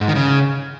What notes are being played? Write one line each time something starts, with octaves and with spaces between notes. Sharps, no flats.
G#2
D#3
C#3